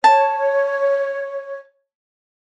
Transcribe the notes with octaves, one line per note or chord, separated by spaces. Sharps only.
C#5 A5